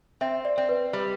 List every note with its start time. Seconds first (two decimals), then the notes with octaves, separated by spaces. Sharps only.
0.21 C4 E5
0.45 D5
0.58 C4
0.69 B4
0.93 G3